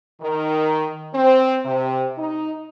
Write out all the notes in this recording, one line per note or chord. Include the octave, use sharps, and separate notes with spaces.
D#3
C4
C3
D#4